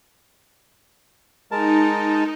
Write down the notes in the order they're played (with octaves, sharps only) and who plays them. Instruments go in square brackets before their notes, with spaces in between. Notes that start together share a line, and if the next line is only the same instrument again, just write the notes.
[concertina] G#3 A#4 A5 [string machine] D#4